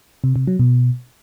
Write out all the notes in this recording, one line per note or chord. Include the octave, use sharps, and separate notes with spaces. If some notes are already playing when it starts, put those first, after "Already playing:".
C3
C3
F#3
B2